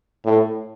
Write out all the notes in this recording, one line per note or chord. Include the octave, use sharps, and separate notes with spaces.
A2